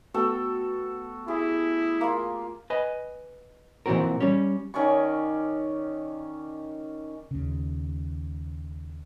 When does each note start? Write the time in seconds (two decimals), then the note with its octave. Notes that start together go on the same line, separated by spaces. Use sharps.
0.14 A3 B3 F#4 A4 G5
1.28 E4 G4 G#4
2.01 A#3 F4
2.70 B4 D#5 G#5 B5
3.86 A#2 E3 F3 C4 F#4 A#4
4.21 G3 C#4
4.74 D#3 C#4 D5 C#6
7.31 D#2 C#3